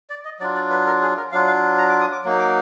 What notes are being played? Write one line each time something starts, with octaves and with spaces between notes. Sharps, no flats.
D5
D#5
F#3 D4 F4 D5
D5
B4
A#4
G#4
A#4
F#3 D4 F4 F5
F5
A#5
D6
D#6
D6
F#3 A#3 D#4
D6